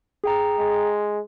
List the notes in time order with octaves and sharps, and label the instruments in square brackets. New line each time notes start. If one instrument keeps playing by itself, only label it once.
[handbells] G#4 G5 A#5
[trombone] G#3